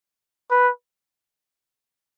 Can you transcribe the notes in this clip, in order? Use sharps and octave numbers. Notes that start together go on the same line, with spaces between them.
B4